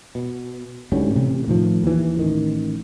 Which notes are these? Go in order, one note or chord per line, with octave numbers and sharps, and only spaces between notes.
B2
D2 G#2 G3 C#4
A1 C3
A2 D#3 F3
D#2 E3
A1 D#3